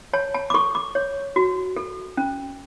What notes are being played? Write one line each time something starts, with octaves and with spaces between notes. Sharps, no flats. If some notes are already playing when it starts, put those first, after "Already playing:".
C#5 A5
A5
D6
A4 C#6
D6
C#5
F#4
A4
C#4